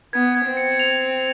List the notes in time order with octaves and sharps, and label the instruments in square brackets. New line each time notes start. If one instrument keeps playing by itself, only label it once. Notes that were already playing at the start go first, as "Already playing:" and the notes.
[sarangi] B3 [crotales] G#6
[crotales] G#6
[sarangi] C4
[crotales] C#7
F7